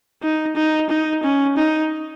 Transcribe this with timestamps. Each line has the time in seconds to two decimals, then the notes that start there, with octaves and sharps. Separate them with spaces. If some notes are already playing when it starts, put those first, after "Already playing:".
0.23 D#4
0.56 D#4
0.90 D#4
1.23 C#4
1.57 D#4